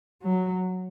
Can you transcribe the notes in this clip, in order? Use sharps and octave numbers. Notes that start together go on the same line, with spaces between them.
F#3